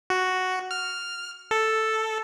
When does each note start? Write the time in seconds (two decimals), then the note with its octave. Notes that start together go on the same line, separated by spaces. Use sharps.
0.10 F#4
0.71 F6
1.51 A4